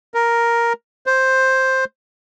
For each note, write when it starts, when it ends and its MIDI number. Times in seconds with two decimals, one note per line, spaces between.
0.14 0.73 70
1.06 1.85 72